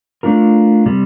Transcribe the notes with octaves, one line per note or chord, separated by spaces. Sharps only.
A3 D4 F4 A#4
C3 G3